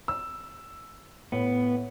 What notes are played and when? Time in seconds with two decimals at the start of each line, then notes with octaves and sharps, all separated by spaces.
0.08 E6
1.32 A2 B3